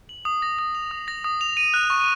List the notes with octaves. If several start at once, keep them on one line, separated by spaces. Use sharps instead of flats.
F#7
D#6
A#6
D#6
F7
D#6
A#6
D#6
F7
D#7
F#6
C#6